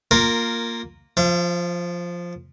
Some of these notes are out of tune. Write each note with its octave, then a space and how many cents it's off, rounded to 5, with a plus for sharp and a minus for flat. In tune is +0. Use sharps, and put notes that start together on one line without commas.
A#3 +0 F4 +5 A#4 -15
F3 +0 F5 -40